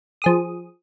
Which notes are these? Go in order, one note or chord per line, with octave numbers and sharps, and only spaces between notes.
F3 G#4 D#6